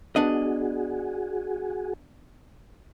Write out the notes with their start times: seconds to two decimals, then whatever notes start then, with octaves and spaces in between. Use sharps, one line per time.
0.16 B3 D4 F#4 G#4 D#5